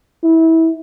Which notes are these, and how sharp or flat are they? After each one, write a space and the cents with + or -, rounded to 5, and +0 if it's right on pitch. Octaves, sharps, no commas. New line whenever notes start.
E4 -25